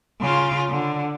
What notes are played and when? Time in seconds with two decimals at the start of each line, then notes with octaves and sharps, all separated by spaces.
0.21 C#3 F4
0.70 D3